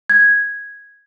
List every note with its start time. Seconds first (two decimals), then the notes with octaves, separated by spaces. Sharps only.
0.10 G#6